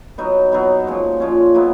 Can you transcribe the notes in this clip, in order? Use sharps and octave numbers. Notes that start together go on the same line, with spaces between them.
F#3 B3 D#4
F#3 B3 D#4
A#2 F3 G#3 C#4
A#2 F3 G#3 C#4
A#2 F#3 B3 E4